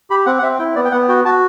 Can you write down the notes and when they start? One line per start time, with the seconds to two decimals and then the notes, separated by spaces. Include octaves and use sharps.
0.10 G4 B5
0.26 C4 F#5
0.39 F#5
0.43 C4 E5
0.59 E4 G5
0.76 B3 D5
0.85 G5
0.92 B3 F#5
1.09 F#4 G5
1.25 F#4 A5